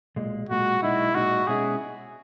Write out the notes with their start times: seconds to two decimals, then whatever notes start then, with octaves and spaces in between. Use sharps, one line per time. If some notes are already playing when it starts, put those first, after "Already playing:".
0.16 B1 A#2 G#3
0.49 B1 A#2 G#3 F#4
0.82 B1 A#2 G#3 D#4 E4
1.14 B1 A#2 G#3 D#4 F#4
1.47 B2 G#3 C#4 E4 G#4